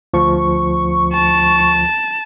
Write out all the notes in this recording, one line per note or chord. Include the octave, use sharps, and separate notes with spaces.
D2 F3 C#6
A5